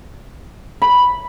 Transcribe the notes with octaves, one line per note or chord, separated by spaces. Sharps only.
B5